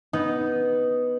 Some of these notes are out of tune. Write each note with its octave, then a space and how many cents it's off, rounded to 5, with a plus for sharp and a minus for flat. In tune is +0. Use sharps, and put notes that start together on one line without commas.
B3 +0 D#4 +0